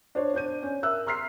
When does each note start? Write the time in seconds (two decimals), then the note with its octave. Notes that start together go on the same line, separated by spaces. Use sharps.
0.15 D4 C5 C#5
0.34 D4 C5 G6 D#7
0.63 C#4
0.83 A#4 E5 E6 F#6
1.07 A#5 C6 F6 B6 C7